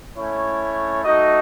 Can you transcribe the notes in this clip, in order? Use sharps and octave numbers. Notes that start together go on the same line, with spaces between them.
A3 C#4 E4 C#5
A3 D#4 F#4 D#5